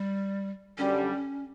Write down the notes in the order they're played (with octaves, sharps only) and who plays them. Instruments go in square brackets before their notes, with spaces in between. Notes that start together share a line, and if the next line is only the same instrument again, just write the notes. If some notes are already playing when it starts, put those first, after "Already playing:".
Already playing: [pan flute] G3
[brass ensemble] F#2 D3 G3 [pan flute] C#4